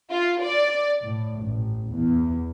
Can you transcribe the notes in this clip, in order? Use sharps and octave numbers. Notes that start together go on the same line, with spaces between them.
F4
D5
A2
A1
E2